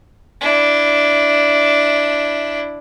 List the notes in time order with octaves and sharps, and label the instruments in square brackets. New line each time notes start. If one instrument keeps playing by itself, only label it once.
[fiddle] D4 E4